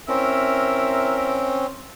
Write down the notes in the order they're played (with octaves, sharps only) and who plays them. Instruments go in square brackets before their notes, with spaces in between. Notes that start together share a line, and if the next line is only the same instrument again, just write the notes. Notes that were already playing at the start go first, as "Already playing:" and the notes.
[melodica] C4 C#4 [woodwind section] E4 A#4 E5